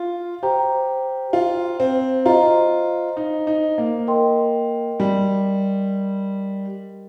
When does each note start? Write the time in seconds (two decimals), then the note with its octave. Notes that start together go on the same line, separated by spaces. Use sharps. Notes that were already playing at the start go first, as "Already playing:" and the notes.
Already playing: F4
0.43 G4 C5 G5 A#5
1.33 F4
1.80 C4
2.25 F4 C5 D#5 A#5
3.17 D#4
3.47 D#4
3.78 A#3
4.07 A#4 D#5 G5 C6
5.00 G3